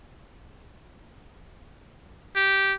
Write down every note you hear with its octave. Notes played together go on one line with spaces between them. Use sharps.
G4